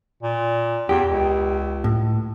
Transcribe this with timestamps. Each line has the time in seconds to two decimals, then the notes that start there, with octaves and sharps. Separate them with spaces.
0.22 A#2
0.89 E2 G4
1.08 C#2
1.84 A2